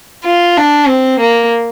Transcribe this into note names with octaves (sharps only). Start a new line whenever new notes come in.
F4
D4
C4
A#3